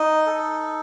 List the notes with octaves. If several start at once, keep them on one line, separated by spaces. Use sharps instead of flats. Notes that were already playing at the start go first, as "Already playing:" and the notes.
Already playing: D#4 D#5
A4